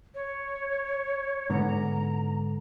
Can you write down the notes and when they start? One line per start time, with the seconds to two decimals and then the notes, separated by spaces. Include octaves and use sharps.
0.15 C#5
1.50 G#2 D3 B3 A#5